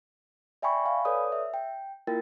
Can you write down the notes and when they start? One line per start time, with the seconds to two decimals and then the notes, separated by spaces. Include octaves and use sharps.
0.62 D5 E5 G5 G#5 B5 C#6
0.85 F5 G#5 B5
1.05 A4 B4 C#5 D5 D#6
1.32 E5
1.54 G5
2.07 A#3 E4 F4 A#4 G5 A6